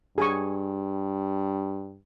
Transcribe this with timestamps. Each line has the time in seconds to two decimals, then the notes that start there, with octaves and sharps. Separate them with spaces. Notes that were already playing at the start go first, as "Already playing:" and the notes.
0.18 G2 G#4 G#5 C#6